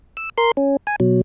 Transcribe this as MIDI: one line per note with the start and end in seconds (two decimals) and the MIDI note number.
0.17 0.30 88
0.38 0.51 70
0.38 0.51 84
0.57 0.77 61
0.87 0.96 80
1.00 1.21 47
1.00 1.21 54